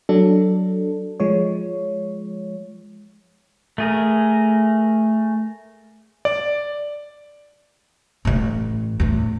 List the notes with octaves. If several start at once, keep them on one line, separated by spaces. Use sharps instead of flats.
F#3 D4 A4
F3 G#3 C#5
A3 G#4 A#4
D5
A1 A2
E2 A2